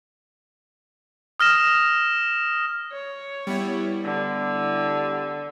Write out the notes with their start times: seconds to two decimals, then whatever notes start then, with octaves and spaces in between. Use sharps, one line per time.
1.40 D#6 F6 A#6 E7
2.92 C#5
3.47 G3 B3 E4
4.04 D3